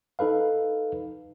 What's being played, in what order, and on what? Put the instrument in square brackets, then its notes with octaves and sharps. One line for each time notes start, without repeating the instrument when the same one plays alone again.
[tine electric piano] D#4 A4 B4 F5